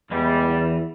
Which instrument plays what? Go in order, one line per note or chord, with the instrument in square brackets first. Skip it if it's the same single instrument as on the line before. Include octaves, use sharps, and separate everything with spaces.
[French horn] E2 [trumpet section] G3 [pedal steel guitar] G#3 B3 E4
[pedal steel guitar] E3